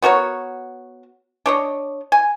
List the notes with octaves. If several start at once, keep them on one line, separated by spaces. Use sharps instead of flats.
B3 F#4 A#4 C#5
D4 C#5 D#5
G#5